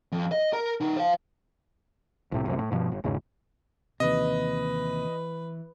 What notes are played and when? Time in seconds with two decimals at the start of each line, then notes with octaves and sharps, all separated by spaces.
0.12 F2
0.32 D#5
0.53 A#4 A#5
0.81 C#3 D#4
0.97 C5 F5
2.32 C2 A2 C3
2.46 F1 C2 F#2
2.59 A2
2.71 G2 B2 F3
2.92 G1
3.04 G#1 E2 G#2 C#3
4.00 D#2 C3 E3 B4 D#5